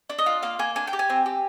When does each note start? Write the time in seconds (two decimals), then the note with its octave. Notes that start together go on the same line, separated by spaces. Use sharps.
0.09 D4
0.18 D#5
0.26 F4
0.43 A#3 F5
0.59 A#3 G#5
0.76 D4 G#5
0.87 G5
0.93 G4
0.99 G#5
1.10 C4
1.26 G4